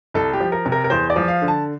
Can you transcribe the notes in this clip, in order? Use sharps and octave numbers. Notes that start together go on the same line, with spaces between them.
C2 A4
G4
F3
A#4
C3
A#4
A#4
E2 C5
D5
F3
F5
D3
A5